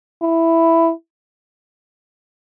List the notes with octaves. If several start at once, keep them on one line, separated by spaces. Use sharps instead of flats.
E4